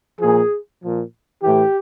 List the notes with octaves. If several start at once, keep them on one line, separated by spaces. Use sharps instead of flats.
A#2 F3 G#4
A#2 F3
A2 E3 G4